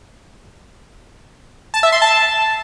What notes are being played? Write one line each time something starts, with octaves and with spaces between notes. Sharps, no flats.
A5
E5
C6
A5